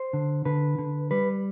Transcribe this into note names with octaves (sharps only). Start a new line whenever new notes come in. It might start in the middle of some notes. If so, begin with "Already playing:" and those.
Already playing: C5
D3
D3 B4
D3
G3 B4